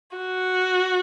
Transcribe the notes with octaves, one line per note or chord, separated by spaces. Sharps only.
F#4